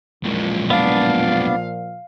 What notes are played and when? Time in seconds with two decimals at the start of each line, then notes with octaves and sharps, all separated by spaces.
0.24 B1 A#2 F3 G#3
0.70 B3 D4 F5